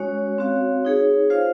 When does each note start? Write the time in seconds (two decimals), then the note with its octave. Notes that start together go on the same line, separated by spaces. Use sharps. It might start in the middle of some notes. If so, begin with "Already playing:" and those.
Already playing: G#3 C#4 F#4 C#5
0.38 C4 F#4 C#5 F5
0.85 D#4 G#4 C#5
1.30 F4 C5 F5